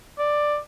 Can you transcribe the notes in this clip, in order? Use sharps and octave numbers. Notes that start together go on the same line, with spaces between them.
D5